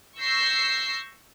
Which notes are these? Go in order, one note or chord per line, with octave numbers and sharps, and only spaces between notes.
C#6 E6 G6 A#6 C7